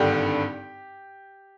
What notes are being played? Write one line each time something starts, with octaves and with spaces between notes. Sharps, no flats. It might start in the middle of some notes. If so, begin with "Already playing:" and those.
Already playing: G#1 G2 D3 G3 G4